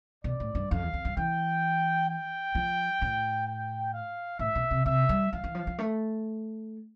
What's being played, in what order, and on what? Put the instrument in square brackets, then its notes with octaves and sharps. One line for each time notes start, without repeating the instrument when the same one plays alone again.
[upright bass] B2 [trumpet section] D5
[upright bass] A2
G2
[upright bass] F2 [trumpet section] F5
[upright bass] E2
F2
G2
[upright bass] E3 [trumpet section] G5
[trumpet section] G5
[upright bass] F3
A2
[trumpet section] G5
F5
[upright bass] A2 [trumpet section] E5
[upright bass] B2
C3
[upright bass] C3 [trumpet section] E5
[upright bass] G3
[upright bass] F3 [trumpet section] F5
[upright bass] E3
F3
F3
A3